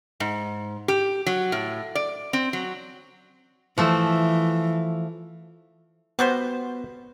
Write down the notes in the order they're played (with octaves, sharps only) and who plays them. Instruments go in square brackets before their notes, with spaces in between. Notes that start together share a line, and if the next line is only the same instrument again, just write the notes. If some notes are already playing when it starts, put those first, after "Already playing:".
[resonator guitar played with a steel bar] G#2
G4
F#3
A2
D5
C4
F#3
[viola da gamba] E3 [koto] F3 A3
[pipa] G3 F#4 C5 [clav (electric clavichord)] B3